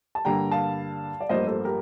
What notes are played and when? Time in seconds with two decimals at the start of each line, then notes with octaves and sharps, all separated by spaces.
0.15 A5
0.25 G2 D3 G3 A#3 G5 A#5
0.51 F5 A5
1.21 D5
1.29 A1 G2 F3 A#3 C5 D#5
1.47 A4 C5
1.65 G4 A#4